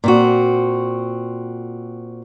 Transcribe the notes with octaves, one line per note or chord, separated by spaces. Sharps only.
A#2 C4 F#4